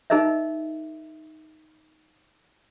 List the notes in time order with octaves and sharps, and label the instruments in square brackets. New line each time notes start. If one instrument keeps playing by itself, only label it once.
[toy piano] D#4 G#4 A#4 D#5 E5